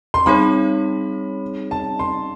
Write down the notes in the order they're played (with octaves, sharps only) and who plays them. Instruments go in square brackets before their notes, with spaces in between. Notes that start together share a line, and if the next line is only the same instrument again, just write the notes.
[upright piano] C6
[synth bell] G3 C4 D#4 G#4 C#5 [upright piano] B5
[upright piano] A5
C6